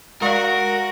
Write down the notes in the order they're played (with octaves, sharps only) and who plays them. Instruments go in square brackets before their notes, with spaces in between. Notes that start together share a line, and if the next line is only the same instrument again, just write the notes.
[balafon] G#3 D5 F5 [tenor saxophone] F#4 [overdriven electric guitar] A#4